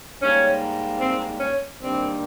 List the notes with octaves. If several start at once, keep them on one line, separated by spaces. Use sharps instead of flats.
G#2 G3 A#3 C#4
C4
C#4
G2 D#3 G3 A#3 C4